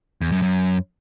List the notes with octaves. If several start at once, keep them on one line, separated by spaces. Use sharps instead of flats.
E2
F#2
F#2